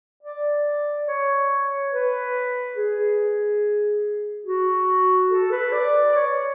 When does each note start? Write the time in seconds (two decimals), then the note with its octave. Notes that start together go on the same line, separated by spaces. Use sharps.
0.23 D5
1.07 C#5
1.91 B4
2.76 G#4
4.46 F#4
5.30 A4
5.51 B4
5.72 D5
6.15 C#5